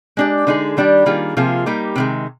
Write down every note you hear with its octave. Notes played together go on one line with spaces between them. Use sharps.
G#3 D4 G4
D3 G#3 D#4 G#4
D#3 G3 D4 G4
D#3 G3 A#3 F4 G#4
C3 F3 A#3 F4 G#4
G3 A#3 D#4 G4
C3 D#3 G#3